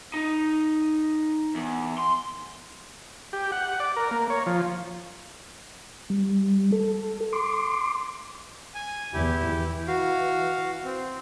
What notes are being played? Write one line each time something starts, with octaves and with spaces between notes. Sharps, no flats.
D#4
E2
C6
G4
F#5
D5
A#4
A#3
C#5
F3
G3
A4
C6 D6
G#5
E2 E4 G4
E3
F#4 F5
C4